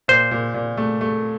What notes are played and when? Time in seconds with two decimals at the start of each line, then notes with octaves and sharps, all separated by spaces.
0.08 A#2 C5
0.31 A#2
0.54 A#2
0.77 A3
1.01 A3